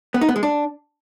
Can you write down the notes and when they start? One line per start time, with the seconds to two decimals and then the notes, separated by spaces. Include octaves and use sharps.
0.14 B3
0.21 D#4
0.29 B3
0.36 G#3
0.43 D4